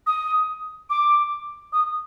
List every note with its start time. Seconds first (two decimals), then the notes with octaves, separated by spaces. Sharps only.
0.07 D#6
0.90 D6
1.73 D#6